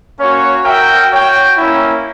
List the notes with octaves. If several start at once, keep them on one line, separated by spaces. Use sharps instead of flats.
A#3 C#4 F#4 C#5
F#4 A#4 E5 G5
F#4 C#5 G5
A#3 C#4 E4